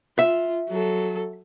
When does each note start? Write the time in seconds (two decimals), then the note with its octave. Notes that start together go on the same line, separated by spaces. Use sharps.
0.19 F4 E5
0.70 F#3 A4